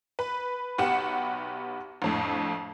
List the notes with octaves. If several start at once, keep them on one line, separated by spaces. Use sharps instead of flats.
B4 B5
B1 B3 G4 F#5 C#7 E7
A#1 F2 A2